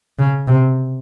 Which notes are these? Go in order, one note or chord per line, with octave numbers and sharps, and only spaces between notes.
C#3
C3